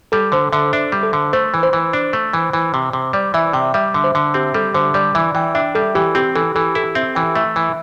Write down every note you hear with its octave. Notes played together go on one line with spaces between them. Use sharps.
G3 A4
D3 C5
D3 E5
D4 E5
G3
A4
D3
A3 C5
E3
C5
E3
D4
A3
E3
E3
C3
C3
G3 D5
E3 E5
C3 G5
G3 E5
D3
C5
D3
C4 G4
G3 A4
D3 C5
G3 D5
E3 E5
E3 G5
D4 E5
G3 A4
E3 G4
C4 G4
E3 A4
E3 A4
E4 A4
C4 E5
E3 G5
A3 E5
E3